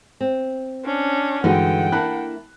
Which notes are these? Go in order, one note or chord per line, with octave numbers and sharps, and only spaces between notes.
C4
C#4 D4
G2 D3 E3 G#3 D#4 F#4 F#5 G5
A#3 D4 E4 A5 B5 F#6